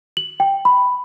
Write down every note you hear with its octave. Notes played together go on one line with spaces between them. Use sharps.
F#7
G5
B5